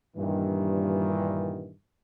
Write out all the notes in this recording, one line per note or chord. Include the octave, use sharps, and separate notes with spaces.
G2 A#2 D#3 E3